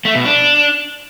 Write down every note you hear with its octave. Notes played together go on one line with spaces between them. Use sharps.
A3
B2
D4